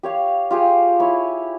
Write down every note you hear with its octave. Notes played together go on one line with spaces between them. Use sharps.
G4 C#5 F5
F4 G4 G#4 G5
E4 C#5